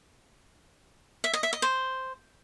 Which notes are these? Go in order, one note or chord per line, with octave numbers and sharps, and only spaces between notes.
E5
D#5
E5
D#5
C5